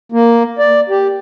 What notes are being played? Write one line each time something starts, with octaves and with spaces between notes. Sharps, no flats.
A#3
D5
G4